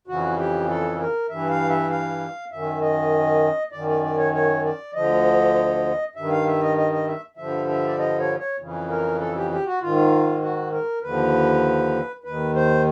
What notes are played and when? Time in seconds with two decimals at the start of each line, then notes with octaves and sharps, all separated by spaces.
0.07 F2 C#3 E3 F#4
0.37 G4
0.68 A4
0.99 A#4
1.29 G2 E3 E5
1.50 F5
1.69 E5
1.90 F5
2.51 F#2 D#3 E5
2.81 D#5
3.72 F#2 D#3 D5
3.88 D5
4.03 D5
4.18 C#5
4.34 C#5
4.64 D5
4.94 D2 D3 F3 D#5
6.15 G2 D#3 E5
6.31 F5
6.47 E5
6.62 D#5
6.77 D#5
6.93 D#5
7.08 E5
7.37 G2 D3 F3 E5
7.69 E5
7.88 D5
7.99 D#5
8.19 C#5
8.38 C#5
8.59 F2 C#3 E3
8.89 A#4
9.19 A4
9.35 G4
9.51 G4
9.66 F#4
9.81 G#2 D#3 F4
10.41 F#4
10.72 A#4
11.02 D#2 D3 F3 B4
12.24 D#2 D#3 B4
12.55 C5